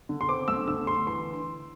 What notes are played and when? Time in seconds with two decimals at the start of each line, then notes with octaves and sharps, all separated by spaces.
0.09 D3
0.21 C6
0.29 C4 D6
0.48 A3 E6
0.67 D3 E6
0.86 D3 C6
1.07 E3 C6